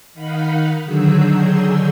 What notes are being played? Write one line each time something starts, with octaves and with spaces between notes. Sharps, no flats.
D#3 D#4 F5 F#5 B5
D3 D#3 F#3 G#4 E6 G6